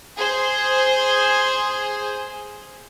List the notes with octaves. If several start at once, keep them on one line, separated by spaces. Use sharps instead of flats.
G#4 C5